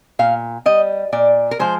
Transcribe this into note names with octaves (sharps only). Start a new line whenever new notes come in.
A#2 F5
G3 D#5
A#2 D5
A#4
F3 G#3 C5